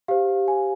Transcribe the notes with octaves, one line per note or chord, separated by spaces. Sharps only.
G4 C5 F5
G#5